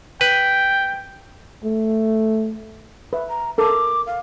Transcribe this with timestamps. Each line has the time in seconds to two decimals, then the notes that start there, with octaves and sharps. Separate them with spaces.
0.21 B4 G5
1.64 A3
3.13 B4 E5
3.29 A#5
3.58 A4 A#4 D6
4.07 F5